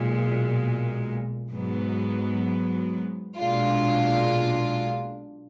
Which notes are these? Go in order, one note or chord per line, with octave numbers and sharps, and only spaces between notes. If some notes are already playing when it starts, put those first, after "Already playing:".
Already playing: B1 A#2 G#3
G#2 F#3 B3
B1 A#2 G#3 D4 F4